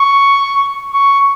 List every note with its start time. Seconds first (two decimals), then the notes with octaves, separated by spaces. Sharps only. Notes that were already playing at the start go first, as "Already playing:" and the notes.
Already playing: C#6
0.94 C#6